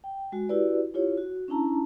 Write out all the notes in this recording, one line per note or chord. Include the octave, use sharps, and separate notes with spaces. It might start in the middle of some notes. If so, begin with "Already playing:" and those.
G5
G#3 F#4
E4 F#4 G4 B4 D5
E4 F4 G4 C#5
F#4
C#4 D4 E4 A5 A#5